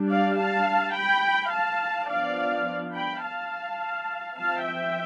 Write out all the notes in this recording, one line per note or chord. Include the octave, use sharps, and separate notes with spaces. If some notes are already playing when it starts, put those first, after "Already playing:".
Already playing: G3 D4
D5 F5
F5 A5
G5 B5
F5 A5
F3 B3 D4 D5 F5
G5 B5
F5 A5
F3 C4 F5 A5
E5 G5